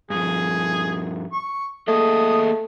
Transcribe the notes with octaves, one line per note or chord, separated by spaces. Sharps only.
G2 F3 G#4
C#6
A3 A#3 G#4 D#5 D#6